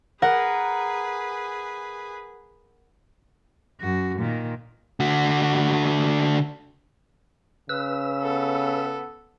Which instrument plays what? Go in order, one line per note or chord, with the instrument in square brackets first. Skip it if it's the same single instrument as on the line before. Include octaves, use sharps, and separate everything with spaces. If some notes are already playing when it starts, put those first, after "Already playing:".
[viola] G#4 B4 [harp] A#4 F#5
[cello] F#2 F#4
A#2 D#3
[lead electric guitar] D3 F#4
[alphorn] C#3 [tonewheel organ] B4 E6
[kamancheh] B3 A4